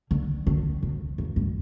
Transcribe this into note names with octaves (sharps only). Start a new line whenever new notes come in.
D3
D3
C3
E2
G2